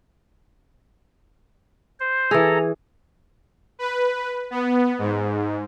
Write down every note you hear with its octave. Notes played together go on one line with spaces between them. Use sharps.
C5
E3 G#4 A4 A#5
B4
B3
G#2